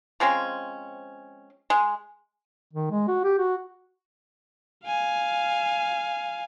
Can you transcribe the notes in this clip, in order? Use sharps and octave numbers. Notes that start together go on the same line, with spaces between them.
F3 G#3 C4 C#4
G#3
D#3
G#3
F#4
G4
F#4
F5 G#5